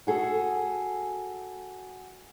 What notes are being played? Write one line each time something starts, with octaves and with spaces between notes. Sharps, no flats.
F#4 G#4 A4